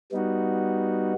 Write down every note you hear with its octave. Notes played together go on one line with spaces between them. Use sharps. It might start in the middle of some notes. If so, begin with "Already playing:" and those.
G3 B3 D#4 F#4